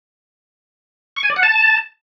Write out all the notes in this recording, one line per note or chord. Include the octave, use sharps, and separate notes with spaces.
C#6
G#5
D5
F#5
A5